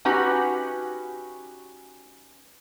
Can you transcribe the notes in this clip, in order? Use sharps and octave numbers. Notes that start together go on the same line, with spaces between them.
C#4 D#4 F#4 G4 B4